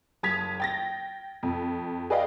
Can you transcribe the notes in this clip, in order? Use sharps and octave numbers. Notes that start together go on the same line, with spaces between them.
F#1 A5 D#6 G#6 B6 F7
G5 A6 A#6
F2
G#4 B4 D5 D#5 F5 G5